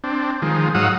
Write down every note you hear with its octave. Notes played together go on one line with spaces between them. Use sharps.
C4 D4
D#3 F3 G#3
G#2 F#3 F5 F#5 D#6 E6